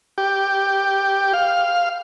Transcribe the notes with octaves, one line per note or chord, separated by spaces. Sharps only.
G4
F5